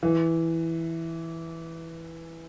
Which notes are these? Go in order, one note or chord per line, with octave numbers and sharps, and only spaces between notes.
E3